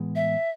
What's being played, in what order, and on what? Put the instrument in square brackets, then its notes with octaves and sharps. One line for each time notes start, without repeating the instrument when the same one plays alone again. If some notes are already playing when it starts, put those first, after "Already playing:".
Already playing: [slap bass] A2 E3 G#3 B3
[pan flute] E5